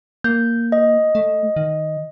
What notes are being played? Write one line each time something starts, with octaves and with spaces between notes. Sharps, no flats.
A#3 G6
D#5
A3
D#3